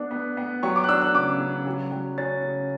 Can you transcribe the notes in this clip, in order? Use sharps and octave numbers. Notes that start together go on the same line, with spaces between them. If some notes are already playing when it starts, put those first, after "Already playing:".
Already playing: B3 D4
B3
B3
F#3 C#6
D6
F#6
D4 E6
F#6
C#3 D6
C#3
F#3
F#3
C#4 A6
C#3